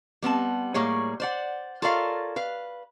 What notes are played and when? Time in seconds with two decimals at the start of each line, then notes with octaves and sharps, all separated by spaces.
0.22 G3 B3 C4 A5
0.74 A2 G3 A#3 G#4 C#5
1.20 C5 D5 F#5
1.82 F4 A4 A#4 C#5 D5 F5
2.36 B4 F5